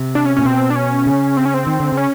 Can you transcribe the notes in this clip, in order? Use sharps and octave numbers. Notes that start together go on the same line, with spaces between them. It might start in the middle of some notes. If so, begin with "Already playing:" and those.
Already playing: C3
D4
C#4
A#2 C#4
B2 C4
D4
C#4
C#3
C4
C#4
C4
D#3
D3
C#3
C#4